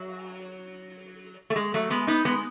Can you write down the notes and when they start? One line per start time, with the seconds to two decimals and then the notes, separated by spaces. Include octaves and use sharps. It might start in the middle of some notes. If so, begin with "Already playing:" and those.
Already playing: F#3
1.50 A3
1.56 G#3
1.74 F#3 A3
1.90 G#3 B3
2.07 B3 D#4
2.25 G#3 B3